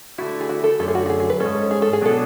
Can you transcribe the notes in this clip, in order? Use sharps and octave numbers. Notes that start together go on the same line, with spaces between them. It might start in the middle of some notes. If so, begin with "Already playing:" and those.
D3 A3 E4 F#4
G#4
F#4
A4
F#2 D3 A3 A4
G#4
F#4
F#4
G#4
G#4
B4
G#2 G#3 C#4 A4
G#4
A4
G#4
B2 F#3 B3 D4 A4